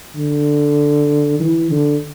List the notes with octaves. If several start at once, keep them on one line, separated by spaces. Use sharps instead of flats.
D3
E3
D3